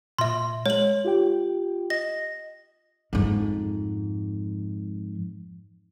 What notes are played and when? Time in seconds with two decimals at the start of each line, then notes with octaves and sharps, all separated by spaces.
0.19 A#2 E5 C6
0.66 G#3 C#5 F#7
1.04 F4 G4 G5
1.90 D#5 A#6
3.13 F2 G#2